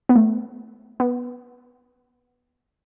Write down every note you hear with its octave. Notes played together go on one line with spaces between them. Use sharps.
B3
A3
B3